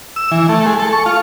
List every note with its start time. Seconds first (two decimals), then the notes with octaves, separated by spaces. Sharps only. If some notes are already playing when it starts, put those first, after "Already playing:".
0.16 E6
0.31 E3
0.49 A3
0.66 G#3
0.79 A4
0.93 C#6
1.06 F4